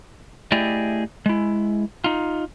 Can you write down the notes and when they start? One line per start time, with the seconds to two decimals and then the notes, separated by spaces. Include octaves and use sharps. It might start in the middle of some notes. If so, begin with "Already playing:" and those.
0.52 A3 E4 G4 G#4 D5 D#5
1.26 G#3 E4
2.04 D#4 F4